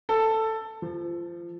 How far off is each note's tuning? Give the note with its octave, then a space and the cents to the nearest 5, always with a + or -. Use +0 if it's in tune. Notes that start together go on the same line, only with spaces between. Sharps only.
A4 +10
F3 -25